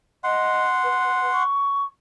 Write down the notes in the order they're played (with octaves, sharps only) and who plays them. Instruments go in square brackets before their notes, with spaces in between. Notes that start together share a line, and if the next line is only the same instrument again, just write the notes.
[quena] D#5 [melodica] F#5 C6
[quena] B4
C#6